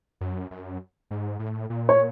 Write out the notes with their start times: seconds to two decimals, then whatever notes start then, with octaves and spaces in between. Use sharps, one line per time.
0.21 F#2
0.51 F#2
1.11 G#2
1.39 A2
1.70 A#2
1.89 C#5